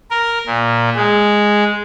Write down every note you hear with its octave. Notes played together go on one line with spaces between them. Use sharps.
A#4
A#2
G#3